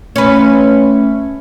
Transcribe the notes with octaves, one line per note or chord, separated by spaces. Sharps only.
A3 C#4 B4